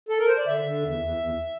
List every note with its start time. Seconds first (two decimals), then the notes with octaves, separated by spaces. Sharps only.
0.09 A4
0.19 A#4
0.28 C5
0.38 D5
0.47 D3 E5
0.64 D3
0.83 E2
1.00 E2
1.17 E2